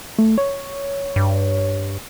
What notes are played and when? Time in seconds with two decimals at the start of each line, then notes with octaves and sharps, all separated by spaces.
0.18 A3
0.38 C#5
1.16 G2